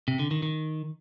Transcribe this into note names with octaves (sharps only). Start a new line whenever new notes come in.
C3
D3
D#3
D#3